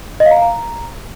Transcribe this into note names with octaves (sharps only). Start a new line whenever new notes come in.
D#5
F5
A#5
F5
A#5